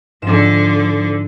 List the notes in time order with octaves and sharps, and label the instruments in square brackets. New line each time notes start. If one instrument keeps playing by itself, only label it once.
[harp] G#2 E7 [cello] D3 F3